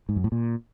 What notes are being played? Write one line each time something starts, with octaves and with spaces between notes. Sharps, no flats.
G#2
F#2
A2
A#2